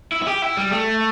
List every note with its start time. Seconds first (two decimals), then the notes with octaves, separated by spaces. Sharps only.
0.12 E4
0.22 E4
0.27 G4
0.42 E4
0.57 G3
0.72 A3